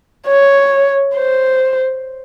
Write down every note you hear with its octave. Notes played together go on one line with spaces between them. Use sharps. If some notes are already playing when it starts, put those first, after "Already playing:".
C#5
C5